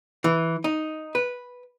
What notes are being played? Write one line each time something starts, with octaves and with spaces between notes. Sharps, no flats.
E3
D#4
B4